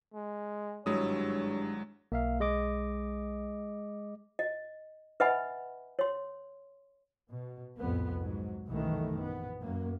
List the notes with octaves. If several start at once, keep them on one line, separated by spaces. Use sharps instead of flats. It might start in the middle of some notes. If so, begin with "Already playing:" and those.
G#3
G#1 G2 F#3 G#3 E4 C#5 D#6
B1 A#3 E5 F5
G#3 D#5 D6
D#5
B4 D#5 E5 F#5 G#5 B5
C#5 C6
B2
C2 F2 A2 B3
G#2 F#3
C2 F#2 B2 D#3 E3 A3
A#1 B3
F#2 F#3 A#3